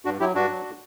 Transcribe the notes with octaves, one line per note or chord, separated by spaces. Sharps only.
G2 D4 F#4
F#3 E4 G4
G2 D4 F#4
F#3